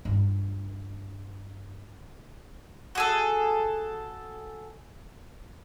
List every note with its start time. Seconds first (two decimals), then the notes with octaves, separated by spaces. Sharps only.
0.05 G2 F4
2.95 F#4 G#4 A4